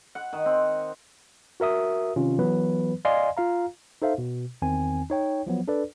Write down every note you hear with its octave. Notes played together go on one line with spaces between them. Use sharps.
F#5
D#3
C4
F#4 A#4 E5 D#6
C3 D#3 C#4 F4
E3 F#3 B3 B4
D5 D#5 F5 G#5 C6
F4 F5 A#5
D#4 A4 C5 E5 F5
B2
E2 D#3 C4 G#5
D#4 C#5 G5
F3 F#3 B3
D4 A4 B4 D5